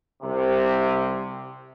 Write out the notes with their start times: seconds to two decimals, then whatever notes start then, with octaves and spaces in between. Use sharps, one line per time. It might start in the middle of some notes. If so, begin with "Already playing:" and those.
0.23 C2 C3